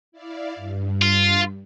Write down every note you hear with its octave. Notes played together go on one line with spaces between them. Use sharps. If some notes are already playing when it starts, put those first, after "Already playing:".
E4 D5 F5
G2
F4